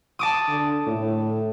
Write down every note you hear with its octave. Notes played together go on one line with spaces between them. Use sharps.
A5 D6 D#6
D3
A2